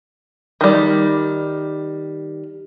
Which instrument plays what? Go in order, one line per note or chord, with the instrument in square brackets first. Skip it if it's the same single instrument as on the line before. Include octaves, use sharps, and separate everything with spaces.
[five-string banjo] D#3 G3